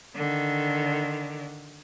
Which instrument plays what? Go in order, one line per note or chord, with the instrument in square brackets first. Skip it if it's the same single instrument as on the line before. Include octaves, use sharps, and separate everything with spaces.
[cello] D3 D#3